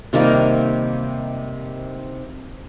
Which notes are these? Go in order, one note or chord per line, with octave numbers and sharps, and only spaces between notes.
C3 D#3 G3 A#3